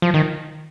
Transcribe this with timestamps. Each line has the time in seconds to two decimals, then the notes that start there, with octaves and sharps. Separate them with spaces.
0.02 F3
0.14 D#3